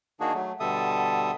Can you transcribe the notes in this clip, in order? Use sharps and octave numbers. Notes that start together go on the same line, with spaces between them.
D#3 A#3 D4 D#4 F#4 G#4
F#3 A3
B2 D3 G3 A4 E5 D#6